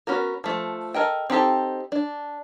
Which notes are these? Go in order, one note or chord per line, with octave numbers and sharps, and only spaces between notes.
B3 C#4 F#4 A#4
F3 A3
A4 A#4 D#5 G5
C4 D#4 G4 A4
D4